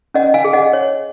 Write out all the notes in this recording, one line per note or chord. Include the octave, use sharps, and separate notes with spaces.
C#4 D#5 F#5
F5 G#5
G#4
D#5 F#5
C#5